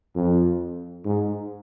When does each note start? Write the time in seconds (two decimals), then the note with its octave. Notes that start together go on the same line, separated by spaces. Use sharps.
0.15 F2
1.05 G#2